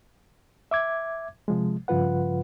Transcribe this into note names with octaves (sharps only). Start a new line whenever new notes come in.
E5 D6 G#6
C3 F3 G#3
G2 C#3 F3 F4 B4 F#5